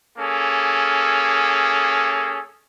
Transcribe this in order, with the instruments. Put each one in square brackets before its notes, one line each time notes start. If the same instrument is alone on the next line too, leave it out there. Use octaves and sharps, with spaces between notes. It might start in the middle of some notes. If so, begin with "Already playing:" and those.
[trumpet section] A#3 C#4 G#4 A4